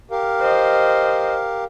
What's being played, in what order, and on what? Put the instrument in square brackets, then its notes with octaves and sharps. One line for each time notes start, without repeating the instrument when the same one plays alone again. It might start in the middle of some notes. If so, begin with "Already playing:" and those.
[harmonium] G4 A#4 F5
[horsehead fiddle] C5 D#5